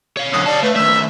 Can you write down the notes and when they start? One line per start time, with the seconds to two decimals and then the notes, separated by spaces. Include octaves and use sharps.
0.17 C#5 F5
0.33 F#2 D3 D#6
0.46 G4 D5 A5
0.63 A3 B4
0.76 D#3 A3 E5 E6